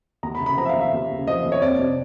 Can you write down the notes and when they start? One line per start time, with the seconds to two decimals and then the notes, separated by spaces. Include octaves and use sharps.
0.23 D#2 A#5
0.35 B5
0.40 C#3
0.46 B5
0.57 F3 A#5
0.65 E5
0.69 F5
0.75 D#2
0.81 E5
0.93 D#2
1.10 C#3
1.27 F3 D#5
1.45 D#2
1.52 C#5
1.62 F2 D5
1.79 C3